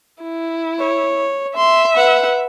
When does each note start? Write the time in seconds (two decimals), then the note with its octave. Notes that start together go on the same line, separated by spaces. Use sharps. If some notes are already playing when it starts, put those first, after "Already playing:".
0.23 E4
0.79 C#5
1.56 E5 C6
1.95 B4 F#5